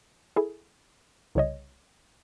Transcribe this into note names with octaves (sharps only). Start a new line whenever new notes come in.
E4 G#4 A4
C2 C#3 C#5 D#5